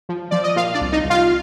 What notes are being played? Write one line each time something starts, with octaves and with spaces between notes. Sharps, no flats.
F3
F3 D5
D#5
A#2 F4 F5
D4 D5
C2
D#4 D#5
C2
F4 F5